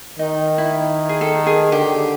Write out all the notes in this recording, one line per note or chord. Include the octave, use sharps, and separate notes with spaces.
D#3 D#4
E4
G#4
A4
G#4
D3 G4